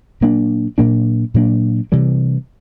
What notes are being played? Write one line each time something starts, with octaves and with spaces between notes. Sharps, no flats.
A#2 F#3 A#3 D4
A#2 F#3 A#3 D4
A#2 F#3 A#3 D4
C3 E3 G3